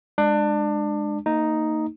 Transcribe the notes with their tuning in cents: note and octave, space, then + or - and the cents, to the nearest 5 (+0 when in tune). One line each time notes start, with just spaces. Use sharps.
G#3 +0 D4 +25
A#3 -40 D#4 +0